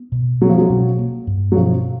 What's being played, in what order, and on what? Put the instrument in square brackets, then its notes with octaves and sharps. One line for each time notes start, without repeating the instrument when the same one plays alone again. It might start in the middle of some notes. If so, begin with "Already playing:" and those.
Already playing: [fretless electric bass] B3
B2
[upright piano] F#3 [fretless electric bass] C4
[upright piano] F3
F#3
[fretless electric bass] B2
A#3
G2
[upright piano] F#3
[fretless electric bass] B2 [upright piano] F3